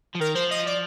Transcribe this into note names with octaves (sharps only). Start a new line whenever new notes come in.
F3
D#3 A#4
F3 C5
D#5
D5